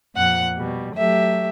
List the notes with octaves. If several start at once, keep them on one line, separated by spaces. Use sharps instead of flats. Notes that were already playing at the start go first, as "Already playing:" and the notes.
F2 A#2 F#5 F#6
B2 G3
F#3 A3 G4 E5